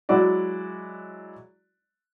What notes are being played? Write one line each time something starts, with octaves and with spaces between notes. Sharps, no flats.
F#3 G#3 E4 F#4 D5